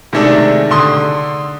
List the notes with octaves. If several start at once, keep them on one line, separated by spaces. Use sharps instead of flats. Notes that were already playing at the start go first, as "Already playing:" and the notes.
C3 D#3 G#3 A3 D4 A4
D3 C6 D#6